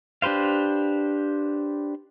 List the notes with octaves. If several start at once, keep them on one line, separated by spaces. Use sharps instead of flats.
D4 G4 B4 C5 F5